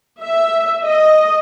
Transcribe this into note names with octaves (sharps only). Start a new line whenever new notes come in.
E5
D#5